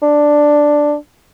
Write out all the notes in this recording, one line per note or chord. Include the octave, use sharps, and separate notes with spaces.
D4